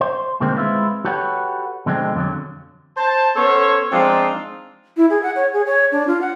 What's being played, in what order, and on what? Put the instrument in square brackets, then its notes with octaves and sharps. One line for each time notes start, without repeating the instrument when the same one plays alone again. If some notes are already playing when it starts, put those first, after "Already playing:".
[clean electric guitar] C5
B2 D3 D#3 G#3 A#3 C4
G#3 C4 E4 F4 B4
F#4 G4 A4 B4 C#5 F#5
B2 D3 F3 G#3 C4
F2 D3 F#3
[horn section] C5 A5
B3 C#4 A4 C5 C#5
F3 G#3 C4 D4 D#4 F4
[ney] E4
G#4
F#5
C#5
G#4
C#5
D4
F4
F#5